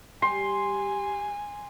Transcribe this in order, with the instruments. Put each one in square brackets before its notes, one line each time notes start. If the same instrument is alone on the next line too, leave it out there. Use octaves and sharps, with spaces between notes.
[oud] G3 G4 [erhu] G#5 [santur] C6